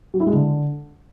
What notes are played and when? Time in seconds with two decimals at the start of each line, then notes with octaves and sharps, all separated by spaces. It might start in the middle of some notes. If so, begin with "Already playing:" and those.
0.14 F#3
0.20 E4
0.27 G#3
0.33 D3